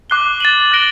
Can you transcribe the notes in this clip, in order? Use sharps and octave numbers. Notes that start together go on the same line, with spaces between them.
D6 F#6 C7 G7
A6 D#7 F#7
F#6 A#6 D7 G7